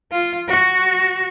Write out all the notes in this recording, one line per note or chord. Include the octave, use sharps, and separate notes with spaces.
F4
F#4